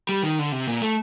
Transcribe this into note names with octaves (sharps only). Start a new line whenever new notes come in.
G3
D#3
D3
C3
A#2
A3